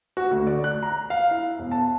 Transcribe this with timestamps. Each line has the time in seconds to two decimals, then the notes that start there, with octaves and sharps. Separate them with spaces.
0.17 F#4
0.31 D2
0.47 D5
0.64 F#6
0.83 A#5
1.10 F5
1.31 E4
1.58 E1
1.71 A5